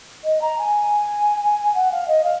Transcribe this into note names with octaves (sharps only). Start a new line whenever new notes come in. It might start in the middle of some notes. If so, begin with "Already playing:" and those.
D#5
A#5
G#5
F#5
F5
D#5
F5